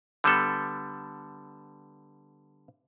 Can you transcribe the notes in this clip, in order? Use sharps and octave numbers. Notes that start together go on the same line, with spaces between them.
D3 G3 B3 A4